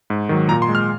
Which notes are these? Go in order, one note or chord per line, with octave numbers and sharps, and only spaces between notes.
G#2
D#3 F#3
A#2 A#5
C6
G#3
F6